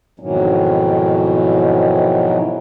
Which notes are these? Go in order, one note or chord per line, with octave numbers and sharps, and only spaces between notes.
F2 G#2 B2 D#3 E3 F#3